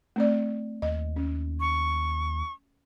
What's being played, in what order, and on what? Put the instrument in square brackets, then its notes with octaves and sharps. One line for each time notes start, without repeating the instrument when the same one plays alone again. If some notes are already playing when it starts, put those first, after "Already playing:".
[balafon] A3 C4 D5
[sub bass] D#2 [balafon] D#5
[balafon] C#4
[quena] C#6